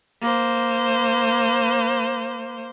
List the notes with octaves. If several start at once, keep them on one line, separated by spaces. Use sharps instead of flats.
A#3 C5